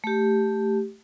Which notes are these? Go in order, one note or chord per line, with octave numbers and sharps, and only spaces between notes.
A3 G4